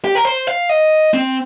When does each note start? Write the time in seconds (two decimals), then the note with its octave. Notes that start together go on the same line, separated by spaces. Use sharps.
0.05 G4
0.15 A#4
0.25 C5
0.47 F5
0.69 D#5
1.14 C4